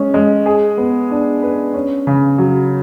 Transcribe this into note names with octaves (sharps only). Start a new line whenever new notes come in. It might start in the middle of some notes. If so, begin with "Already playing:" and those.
Already playing: G#3 C#4 G#4
G#3
G#4
B3
D4
B4
C#4
C#3
F#3